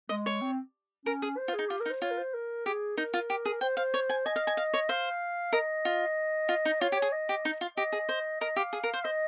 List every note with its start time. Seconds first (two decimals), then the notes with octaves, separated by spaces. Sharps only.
0.09 G#3 D#5
0.26 C#5
0.41 C4
1.05 C#4 A#4
1.22 G#4
1.37 C5
1.48 F4
1.54 G#4
1.59 D#4
1.69 F4 G4
1.80 A#4
1.86 D#4
1.90 C5
2.01 F4 C#5
2.11 A#4
2.18 C5
2.34 A#4
2.66 G4 G#4
2.97 D#4 A#4
3.14 F4
3.30 G4
3.45 G#4
3.61 C5 G5
3.77 C5 F5
3.94 C#5
4.10 G#5
4.25 D#5 G#5
4.36 F5
4.47 G#5
4.57 F5
4.74 C#5
4.89 C5 F5
5.53 A#4 D#5
5.85 F4
6.49 F4
6.65 D#4
6.81 F4 C#5
6.92 G4
6.96 C#5
7.02 G#4
7.12 D#5
7.29 G4
7.45 D#4
7.61 F4
7.77 G4 D#5
7.93 G#4
8.09 C5
8.41 A#4 D#5
8.56 G4 F5
8.73 G#4
8.84 A#4
8.94 C5
9.04 C5 D#5